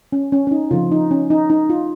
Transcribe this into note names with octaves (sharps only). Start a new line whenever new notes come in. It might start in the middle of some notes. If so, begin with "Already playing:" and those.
C#4
C#4
C#4
D#4
C#3 F3 C4 F4
D#4
C#4
D#4
D#4
F4